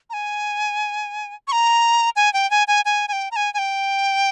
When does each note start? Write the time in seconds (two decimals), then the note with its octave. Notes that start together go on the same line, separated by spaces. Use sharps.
0.10 A#5
0.13 G#5
1.48 C#6
1.52 A#5
2.16 G#5
2.33 G5
2.51 G#5
2.68 G#5
2.85 G#5
3.08 G#5
3.13 G5
3.31 A#5
3.36 G#5
3.54 G#5
3.59 G5